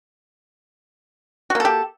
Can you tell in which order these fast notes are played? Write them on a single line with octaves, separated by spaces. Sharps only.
F#4 A#3 A4 G4